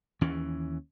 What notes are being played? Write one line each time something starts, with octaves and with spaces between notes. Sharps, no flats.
D#2 E3 C#4